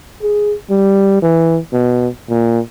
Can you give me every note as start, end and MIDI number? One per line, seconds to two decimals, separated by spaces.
0.22 0.54 68
0.70 1.18 55
1.22 1.59 52
1.73 2.07 47
2.30 2.59 46